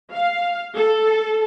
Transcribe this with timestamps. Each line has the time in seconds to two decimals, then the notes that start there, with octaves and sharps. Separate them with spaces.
0.12 F5
0.75 A4